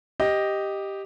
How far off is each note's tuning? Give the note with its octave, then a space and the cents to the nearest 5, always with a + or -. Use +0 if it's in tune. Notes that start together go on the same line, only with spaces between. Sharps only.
G4 +0 D#5 +0